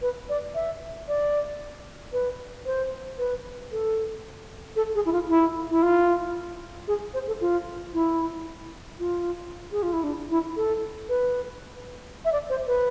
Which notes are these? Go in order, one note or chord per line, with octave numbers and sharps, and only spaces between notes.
B4
D5
E5
D5
B4
C5
B4
A4
A4
G#4
E4
F4
E4
E4
F4
G#4
C5
A4
F4
E4
F4
G#4
F4
E4
D4
E4
A4
B4
E5
D5
C5
B4